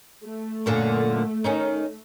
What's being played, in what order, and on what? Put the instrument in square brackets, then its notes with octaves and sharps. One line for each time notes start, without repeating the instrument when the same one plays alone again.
[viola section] A3
[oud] F#2 A#2 D3
D#3 C#4 D#4